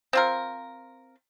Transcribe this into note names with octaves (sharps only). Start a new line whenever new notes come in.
C4 F4 A#4